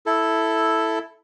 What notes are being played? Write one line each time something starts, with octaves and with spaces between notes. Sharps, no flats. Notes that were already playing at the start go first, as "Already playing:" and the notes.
E4 A4